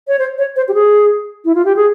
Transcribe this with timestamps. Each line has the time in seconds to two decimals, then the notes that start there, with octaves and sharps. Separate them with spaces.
0.08 C#5
0.19 C5
0.38 C#5
0.56 C5
0.68 G4
0.74 G#4
1.45 E4
1.55 F4
1.65 G4
1.76 G#4